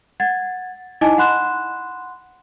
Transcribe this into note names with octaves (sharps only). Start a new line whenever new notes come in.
F#5 G#6 A6
D#4 E4 D#5 G#5 A5 D6
F#5 B5 C6 F#6 E7